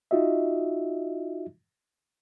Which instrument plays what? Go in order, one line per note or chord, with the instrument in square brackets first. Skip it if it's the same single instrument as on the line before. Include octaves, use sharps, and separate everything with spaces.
[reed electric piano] D#4 F4 F#4 D#5 E5